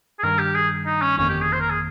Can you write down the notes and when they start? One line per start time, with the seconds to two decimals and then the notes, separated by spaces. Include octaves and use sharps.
0.19 G#4
0.23 G2 D#3 G3 A#4
0.39 G4
0.54 G#4
0.86 D#4
1.02 C#4
1.18 G1 F2 D#3 A#3 C#4
1.29 G4
1.41 G#4
1.53 C5
1.61 A#4
1.70 G#4